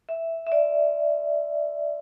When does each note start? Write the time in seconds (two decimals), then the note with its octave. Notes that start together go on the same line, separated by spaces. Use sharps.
0.09 E5
0.47 E5
0.52 D5